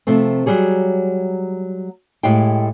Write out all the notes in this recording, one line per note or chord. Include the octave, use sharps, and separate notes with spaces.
C3 F3 A3 C4
F#3 G3 G#4 C#5
A2 G#3 E4 G4 F5 G5